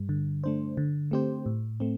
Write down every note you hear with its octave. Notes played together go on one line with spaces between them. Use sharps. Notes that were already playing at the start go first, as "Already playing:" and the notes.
Already playing: G2
D3
A3 D4 C5
D3
A3 C4 G4 C5
A2
A3 C4